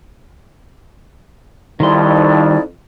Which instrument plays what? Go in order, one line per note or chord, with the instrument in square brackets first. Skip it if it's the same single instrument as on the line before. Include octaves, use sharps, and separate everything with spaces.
[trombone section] F2 [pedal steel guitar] D#3 G3 C6 [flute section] D#4 E4 D5